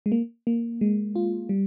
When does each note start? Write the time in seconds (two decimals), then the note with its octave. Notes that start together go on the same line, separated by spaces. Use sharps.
0.06 G#3
0.12 A#3
0.47 A#3
0.81 G#3
1.16 F4
1.49 G3